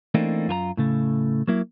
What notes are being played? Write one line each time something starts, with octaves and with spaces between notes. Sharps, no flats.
E3 A3 A#3 C4 D4 D#4
F#2 F4 A#4 A#5
A2 C#3 A3
F#3 A#3 E4